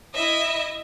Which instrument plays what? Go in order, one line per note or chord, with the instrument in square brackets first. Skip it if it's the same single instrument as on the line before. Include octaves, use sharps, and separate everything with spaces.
[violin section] E4 D#5 E5